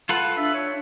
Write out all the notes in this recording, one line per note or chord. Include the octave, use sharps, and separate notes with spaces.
F4 A4 B4 F#5
D4 E5
C#5